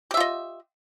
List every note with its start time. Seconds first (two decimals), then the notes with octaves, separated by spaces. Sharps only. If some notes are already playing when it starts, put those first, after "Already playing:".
0.11 G4
0.14 E5
0.17 F4
0.20 D#5